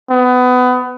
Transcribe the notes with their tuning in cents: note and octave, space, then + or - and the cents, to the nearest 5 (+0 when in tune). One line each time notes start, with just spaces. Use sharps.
B3 +25